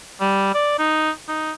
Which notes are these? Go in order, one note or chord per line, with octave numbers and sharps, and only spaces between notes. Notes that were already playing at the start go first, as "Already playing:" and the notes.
G3
D5
D#4
D#4